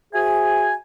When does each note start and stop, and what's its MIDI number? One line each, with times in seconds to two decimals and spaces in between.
0.14 0.73 66
0.14 0.73 68
0.14 0.73 72
0.14 0.73 76
0.14 0.73 80